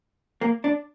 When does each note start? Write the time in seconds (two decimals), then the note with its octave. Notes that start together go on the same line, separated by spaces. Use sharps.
0.41 A#3
0.64 D4